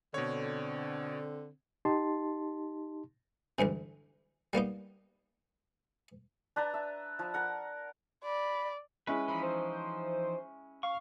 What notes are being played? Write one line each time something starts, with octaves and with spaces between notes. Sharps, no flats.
B2 D3 C4 C#5
D#4 G4 A5 C6
A1 D2 G2 C3
G3 A#3 B3 D#4
D4 B4 A5 A#5
E5
F3
A#4 F#5
D5 B5
G#3 C#4 E4 B4
E3 F3 D#4 B5
C5
F5 C#6